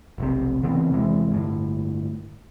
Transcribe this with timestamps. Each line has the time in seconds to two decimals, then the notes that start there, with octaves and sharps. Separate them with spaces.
0.18 F1 B1 C3
0.63 C#3 E3 B3 C4
0.91 E2 C3 E3 G#3
1.31 G1 A2